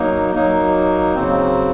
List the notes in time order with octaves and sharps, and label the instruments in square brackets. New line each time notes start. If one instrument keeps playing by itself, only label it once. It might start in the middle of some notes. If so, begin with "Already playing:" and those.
Already playing: [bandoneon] F#3 A#3 D#4
F#3 A#3 D#4
C#3 F#3 C4